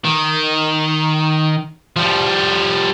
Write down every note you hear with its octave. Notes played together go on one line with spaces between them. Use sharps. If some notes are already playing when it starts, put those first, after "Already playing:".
D#3
F3 G3